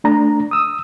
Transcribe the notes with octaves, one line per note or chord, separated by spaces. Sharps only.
A3 D4 A#5
D#6 E6